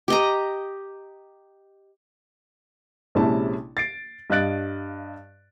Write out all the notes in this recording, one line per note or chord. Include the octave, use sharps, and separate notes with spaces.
G4 D#5 A#5
A#1 C3 G#3 C#4 E4 A5
A6 C7 D7
G2 D#5 F5 F#6 A6 D7